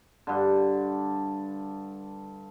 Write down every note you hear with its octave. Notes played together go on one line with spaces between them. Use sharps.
G2 D3